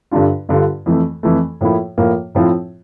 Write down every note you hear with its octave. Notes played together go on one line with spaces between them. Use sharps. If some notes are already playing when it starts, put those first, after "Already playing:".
G2 D3 G3 D4 F4
G2 D3 G3 D4 F4
F2 E3 A3
F2 E3 A3
A2 F3 A#3 E4
A2 F3 A#3 E4
A2 F3 C4 E4